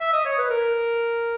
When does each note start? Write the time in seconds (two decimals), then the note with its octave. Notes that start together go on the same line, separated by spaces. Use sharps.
0.01 E5
0.13 D#5
0.25 C#5
0.38 B4
0.51 A#4